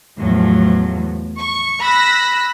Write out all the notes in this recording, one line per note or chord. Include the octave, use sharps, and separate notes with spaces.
E2 A2 F3 F#3
C#6
B5 E6 F#6 A#6 B6